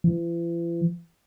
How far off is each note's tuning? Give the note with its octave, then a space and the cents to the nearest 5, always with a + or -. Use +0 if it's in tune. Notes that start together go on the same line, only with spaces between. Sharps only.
E3 +45